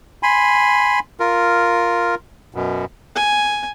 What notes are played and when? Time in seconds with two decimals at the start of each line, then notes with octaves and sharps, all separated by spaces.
0.23 G#5 B5 C6
1.20 F4 A#4
2.54 F#2 B2
3.16 G#5